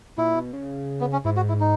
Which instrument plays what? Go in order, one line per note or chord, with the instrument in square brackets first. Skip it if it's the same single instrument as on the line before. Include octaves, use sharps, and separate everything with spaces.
[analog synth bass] A#2 [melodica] E4
[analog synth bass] B2
C#3
[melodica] B3
C#4
[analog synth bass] G#2 [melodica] E4
[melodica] F#4
E4
D#4